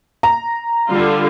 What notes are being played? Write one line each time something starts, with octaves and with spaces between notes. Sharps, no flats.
A#5
D3 G3 F4